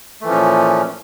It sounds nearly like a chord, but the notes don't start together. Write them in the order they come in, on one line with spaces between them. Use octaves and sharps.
A3 E3 F3 C#4 A#2